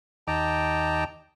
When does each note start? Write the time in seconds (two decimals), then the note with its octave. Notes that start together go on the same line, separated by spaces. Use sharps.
0.28 D#2 D#5 G5 A5 A#5 D6